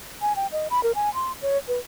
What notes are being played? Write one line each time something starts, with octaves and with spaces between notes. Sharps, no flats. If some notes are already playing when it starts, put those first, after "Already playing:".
G#5
G5
D#5
B5
A#4
G#5
C6
C#5
B4